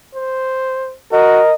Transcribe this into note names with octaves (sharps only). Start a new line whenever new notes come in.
C5
F#4 A#4 D#5